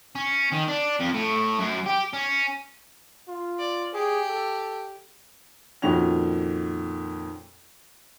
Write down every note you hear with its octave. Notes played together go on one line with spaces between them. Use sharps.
C#4
D#3
D4
F2
A2
F#2
G4
C#4
F4
D5
G4 G#4
A4
F2 A#2 D#3 C#4 F#4 F7